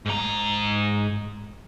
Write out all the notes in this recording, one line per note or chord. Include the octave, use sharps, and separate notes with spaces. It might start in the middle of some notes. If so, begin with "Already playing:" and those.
G#2 A#5